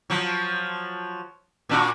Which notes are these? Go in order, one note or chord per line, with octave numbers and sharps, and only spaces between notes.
F3 F#3
A#2 D4 F#4